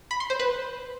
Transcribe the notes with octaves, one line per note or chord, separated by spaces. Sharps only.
B5
C6
C5
B4